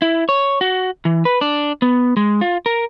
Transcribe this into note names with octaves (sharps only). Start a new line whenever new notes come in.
E4
C#5
F#4
E3
B4
D4
B3
G#3
F4
A#4